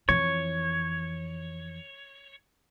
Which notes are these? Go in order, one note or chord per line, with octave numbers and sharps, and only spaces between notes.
F2 E3 C#5